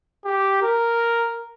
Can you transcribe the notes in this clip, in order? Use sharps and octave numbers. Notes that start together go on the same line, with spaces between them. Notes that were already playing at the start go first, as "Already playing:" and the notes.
G4
A#4